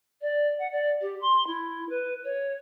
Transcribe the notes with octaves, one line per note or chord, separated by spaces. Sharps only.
D5
F#5
D5
G4
C6
E4
B4
C#5